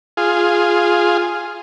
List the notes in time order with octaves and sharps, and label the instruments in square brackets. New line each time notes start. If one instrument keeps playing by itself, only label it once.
[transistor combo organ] F4 G#4